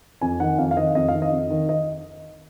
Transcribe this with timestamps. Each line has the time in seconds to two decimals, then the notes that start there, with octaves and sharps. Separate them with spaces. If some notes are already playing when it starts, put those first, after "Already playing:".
0.21 F2 G#5
0.40 D#3 F#5
0.58 F2 F5
0.71 F5
0.77 D#3 D#5
0.95 F2 D#5
1.08 F5
1.14 D#3
1.22 D#5
1.32 F2
1.50 D#3
1.69 D#5